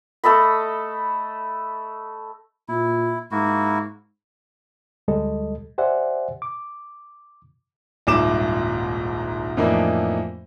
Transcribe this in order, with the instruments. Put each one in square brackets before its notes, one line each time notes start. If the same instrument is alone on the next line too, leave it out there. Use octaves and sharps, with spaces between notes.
[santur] A3 A4 D#5 B5
[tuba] A#2 [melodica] E4
[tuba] G#2 [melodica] A#3 E4 F#4
[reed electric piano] D2 G3 G#3 A4 D#5
G4 C5 D5 E5 F#5 G#5
D6
[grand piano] D#1 C2 G#2 D6 E7
F2 A2 E3 A#3 D4 D#4